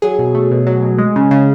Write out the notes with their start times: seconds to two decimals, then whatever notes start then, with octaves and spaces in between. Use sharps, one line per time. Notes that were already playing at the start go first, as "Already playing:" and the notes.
0.02 F#3 G#4
0.19 B2
0.35 A3
0.51 B2
0.67 F#3
0.82 B2
0.98 G#3
1.16 C#3
1.31 C#3